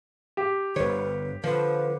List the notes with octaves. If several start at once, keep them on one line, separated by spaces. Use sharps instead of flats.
G4
G1 D3 B4 C#5
D3 F3 B4